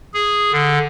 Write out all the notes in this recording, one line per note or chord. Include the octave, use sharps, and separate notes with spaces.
G#4
D3